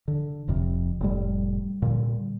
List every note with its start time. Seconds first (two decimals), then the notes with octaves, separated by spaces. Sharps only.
0.08 D3
0.48 F1 F2 C3
1.01 F1 A2 G3
1.82 A#2 D3 G3